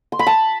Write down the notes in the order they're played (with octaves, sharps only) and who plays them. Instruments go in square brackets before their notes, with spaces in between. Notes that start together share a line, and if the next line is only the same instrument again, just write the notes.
[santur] C6
B5
A5